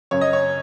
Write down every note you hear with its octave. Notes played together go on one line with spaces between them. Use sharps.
F#2 C#3 C#5
D#5
C#5